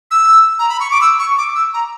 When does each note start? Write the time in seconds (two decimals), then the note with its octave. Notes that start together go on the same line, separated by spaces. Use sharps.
0.11 E6
0.59 A#5
0.69 B5
0.80 C#6
0.91 D6
1.01 E6
1.19 C#6
1.38 D6
1.55 E6
1.74 A#5